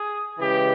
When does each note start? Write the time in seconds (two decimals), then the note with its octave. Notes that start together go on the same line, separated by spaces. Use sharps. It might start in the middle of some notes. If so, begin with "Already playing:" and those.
Already playing: G#4
0.38 C#3 E3 G#3 G4